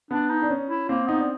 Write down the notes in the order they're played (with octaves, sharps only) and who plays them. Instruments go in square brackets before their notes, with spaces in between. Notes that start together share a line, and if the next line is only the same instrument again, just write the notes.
[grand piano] B3 [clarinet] D4
[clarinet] D#4
[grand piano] D4
C#4
[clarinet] E4
[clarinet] A#3 [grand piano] C4
[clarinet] B3 [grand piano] D#4
[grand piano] D4